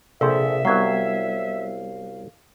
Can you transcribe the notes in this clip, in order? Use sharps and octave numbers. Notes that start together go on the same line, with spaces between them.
A#1 C3 G#4 A4 C5 E5
C2 F#3 G3 B3 F5 G#6